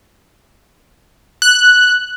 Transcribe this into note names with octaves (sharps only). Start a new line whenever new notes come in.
F#6